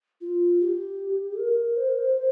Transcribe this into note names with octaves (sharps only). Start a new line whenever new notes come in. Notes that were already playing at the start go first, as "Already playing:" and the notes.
F4
G4
A#4
C5
A#4
C5
C5